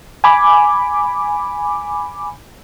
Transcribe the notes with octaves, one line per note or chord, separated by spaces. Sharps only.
G#5 B5 D6